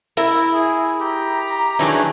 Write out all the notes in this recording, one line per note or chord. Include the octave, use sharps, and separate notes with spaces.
E4 A#4 E5
G#4
G4 A#5
D#3 E3 F#3 D4 G#4